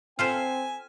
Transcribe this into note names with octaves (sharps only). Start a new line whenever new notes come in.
C4 F4 A4 C5 G#5 F6 B6 E7